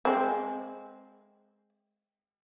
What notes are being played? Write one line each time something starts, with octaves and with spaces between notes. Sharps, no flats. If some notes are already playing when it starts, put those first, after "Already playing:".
G#3 C4